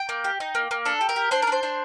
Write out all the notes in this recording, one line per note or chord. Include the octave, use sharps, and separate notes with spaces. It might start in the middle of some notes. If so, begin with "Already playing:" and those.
Already playing: G5
A#3
G4
D#4
A#3
A#3
D4 A4
G4
A#4
G4
D4 C5
A#4
D4 C5
D4